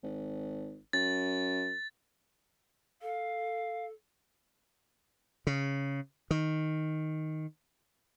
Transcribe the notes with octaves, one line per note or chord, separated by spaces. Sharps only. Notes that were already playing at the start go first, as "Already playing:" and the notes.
G#1
F#2 A6
A4 F5
C#3
D#3